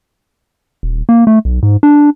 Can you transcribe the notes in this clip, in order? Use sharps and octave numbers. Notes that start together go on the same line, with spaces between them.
D#1
A#3
A3
B1
G#2
D4